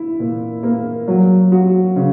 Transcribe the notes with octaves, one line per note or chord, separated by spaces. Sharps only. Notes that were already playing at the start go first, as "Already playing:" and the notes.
Already playing: E4
A#2
A#3
F#3
F#4
C#3